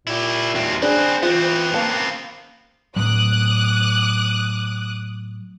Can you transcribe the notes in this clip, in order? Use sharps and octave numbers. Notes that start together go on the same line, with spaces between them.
A#2 E4 G4
D#2 C4 F#4 E5
C4 D4 G#4 B4 C5
E3 B3 C4 F4
A#3 F5 A5
A2 F#3 D6 D#6 F#6